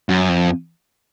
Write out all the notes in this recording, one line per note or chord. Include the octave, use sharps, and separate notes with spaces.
F#2
F2